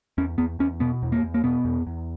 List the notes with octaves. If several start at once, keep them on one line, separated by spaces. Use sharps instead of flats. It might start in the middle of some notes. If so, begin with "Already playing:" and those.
E2 C#4
E2 B3
E2 C#4
B2 B3
E2
A#3
E2
A#3
B2 B3
E2
E2